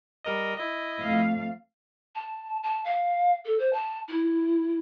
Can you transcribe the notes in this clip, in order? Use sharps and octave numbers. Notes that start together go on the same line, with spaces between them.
G3 A#4 D#5
E4 D#5
F2 A3 F5
A5
A5
F5
A4
C5
A5
E4